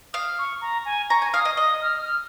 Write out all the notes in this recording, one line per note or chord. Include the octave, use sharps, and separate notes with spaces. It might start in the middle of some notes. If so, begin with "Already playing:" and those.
F5 D#6
C#6
A#5
G#5
A#5 C#6
G#5
F5 D#6
D#5
D#5 D#6
F6
F6